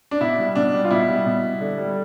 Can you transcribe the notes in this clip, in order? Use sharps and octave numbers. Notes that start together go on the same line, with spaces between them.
D4
B2 E4
G3
B2 D4
G3
F4
B2 E4
G3
B2
G3
D3
G3